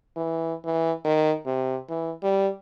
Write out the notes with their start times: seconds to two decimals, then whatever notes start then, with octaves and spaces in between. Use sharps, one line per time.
0.16 E3
0.65 E3
1.05 D#3
1.46 C3
1.89 E3
2.23 G3